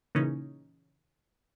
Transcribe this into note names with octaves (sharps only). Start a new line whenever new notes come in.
A#2 C#3 E3 C#4 D#4